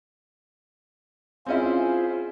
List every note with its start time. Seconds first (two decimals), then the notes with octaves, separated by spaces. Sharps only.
1.47 C4 C#4 E4 F4 G#4 C5